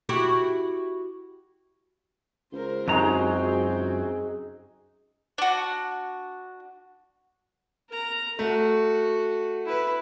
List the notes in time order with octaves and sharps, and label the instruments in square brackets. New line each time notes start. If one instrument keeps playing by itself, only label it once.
[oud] E4 F#4 G4
[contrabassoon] C#2 [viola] A#4 C5
[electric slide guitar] F#2 F#3 A#5 [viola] C4 F#4 [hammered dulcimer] D#4 G#4 G#5
[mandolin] D4 F#4
[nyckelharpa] A#4 A#5
[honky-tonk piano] A3 [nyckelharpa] F#4
[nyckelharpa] E4 B4